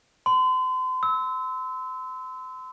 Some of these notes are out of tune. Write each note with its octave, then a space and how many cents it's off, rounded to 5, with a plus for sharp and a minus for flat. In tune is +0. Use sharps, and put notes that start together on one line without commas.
C6 -40
E6 -25